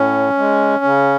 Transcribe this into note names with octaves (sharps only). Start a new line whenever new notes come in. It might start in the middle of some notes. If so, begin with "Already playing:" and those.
Already playing: A2 C#4
G#3
C#3